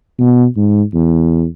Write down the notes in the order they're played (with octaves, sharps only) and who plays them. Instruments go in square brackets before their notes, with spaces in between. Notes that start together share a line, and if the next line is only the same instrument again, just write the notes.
[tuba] B2
G#2
E2